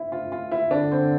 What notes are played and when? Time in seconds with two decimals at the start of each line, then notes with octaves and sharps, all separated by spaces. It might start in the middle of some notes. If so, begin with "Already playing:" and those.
Already playing: E4
0.12 F4
0.32 F4
0.52 E4
0.71 D3 D4
0.92 C4